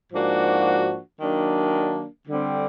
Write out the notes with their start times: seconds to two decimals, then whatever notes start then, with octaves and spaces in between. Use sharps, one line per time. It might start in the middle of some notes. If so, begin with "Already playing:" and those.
0.13 G#2 F3 A#3 D4 F#4
1.20 D#3 F#3 A#3 D4
2.28 D3 G3 C4